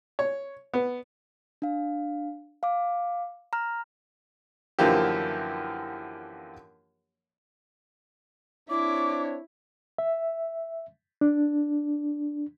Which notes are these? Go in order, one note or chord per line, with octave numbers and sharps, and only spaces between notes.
C#5
B3
D4 F5
F5 D6
A#5 F6
F#2 D3 E3 F3 A#3 G4
C4 D4 E4 C#5 D6
E5
D4